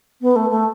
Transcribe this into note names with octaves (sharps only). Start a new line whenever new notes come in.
B3
A3
A3